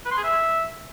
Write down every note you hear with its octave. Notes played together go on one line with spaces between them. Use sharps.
B4
C6
G#4
E5